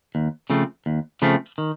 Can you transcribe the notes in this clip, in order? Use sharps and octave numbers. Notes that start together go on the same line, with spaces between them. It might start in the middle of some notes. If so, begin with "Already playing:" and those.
D#2
C#3 F3 A3 C4
D#2
C#3 F3 A3 C4
D#3